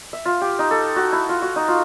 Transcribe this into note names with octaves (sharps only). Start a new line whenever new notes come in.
E5
F4
G4
D#4
A4
F#4
E4
F4
F#4
D#4
F4